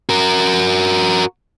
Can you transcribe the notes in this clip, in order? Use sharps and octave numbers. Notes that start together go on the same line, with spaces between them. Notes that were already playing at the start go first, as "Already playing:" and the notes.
F#4 A#4